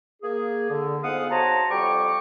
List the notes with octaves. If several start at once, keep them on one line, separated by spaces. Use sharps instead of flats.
A#3 G#4
D3
F2 G#2 B3 F5 F#5 D#6
F#4 C5 C#5 A5 A#5
F2 G3 G5 C#6 D6